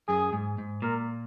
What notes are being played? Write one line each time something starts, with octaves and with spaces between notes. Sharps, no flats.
F#2 G#4
G#2
G#2
A#2 A#4